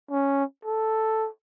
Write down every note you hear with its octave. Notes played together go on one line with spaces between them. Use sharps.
C#4
A4